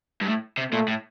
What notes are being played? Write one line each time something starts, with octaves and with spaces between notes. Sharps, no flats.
G2
A2
C3
A#2 A3
A2